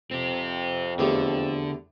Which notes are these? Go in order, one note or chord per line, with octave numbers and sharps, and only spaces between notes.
F2 C4 G4
E2 D3 A3 G4